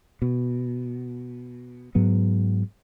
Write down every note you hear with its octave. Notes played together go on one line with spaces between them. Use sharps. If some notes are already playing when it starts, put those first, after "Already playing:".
B2
G#2 F#3 B3